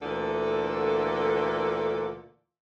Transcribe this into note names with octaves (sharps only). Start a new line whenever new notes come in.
D2 A#2 D3 E3 A4